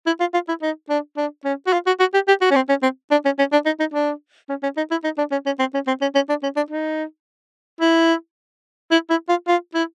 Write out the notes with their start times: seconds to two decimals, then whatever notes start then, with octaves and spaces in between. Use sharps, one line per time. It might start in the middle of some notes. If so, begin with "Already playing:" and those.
0.06 E4
0.20 F4
0.34 F4
0.48 E4
0.62 D#4
0.90 D4
1.17 D4
1.45 C#4
1.67 F#4
1.73 F4
1.87 F#4
2.00 F#4
2.14 G4
2.28 G4
2.41 F#4
2.51 C#4
2.56 C4
2.69 C#4
2.83 C4
3.11 D4
3.25 C#4
3.39 C#4
3.52 D4
3.66 D#4
3.80 D#4
3.94 D4
4.49 C#4
4.63 C#4
4.77 D#4
4.91 E4
5.04 D#4
5.18 D4
5.32 C#4
5.46 C#4
5.59 C4
5.74 C#4
5.87 C4
6.02 C#4
6.15 C#4
6.29 D4
6.43 C#4
6.56 D4
6.71 D#4
7.81 E4
8.91 E4
9.10 E4
9.29 F4
9.48 F4
9.75 E4